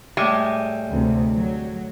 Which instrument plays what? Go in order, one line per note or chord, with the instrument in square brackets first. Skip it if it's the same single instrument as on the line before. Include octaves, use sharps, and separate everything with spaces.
[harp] A2 E5 [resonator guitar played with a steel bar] G3 G#3
[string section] D2 C3
F#3